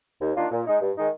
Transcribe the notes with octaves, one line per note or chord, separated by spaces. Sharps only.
D#2
D#3 A#3 D4 F4
A#2
G#3 D#4
G2
D#3 G#3 D#4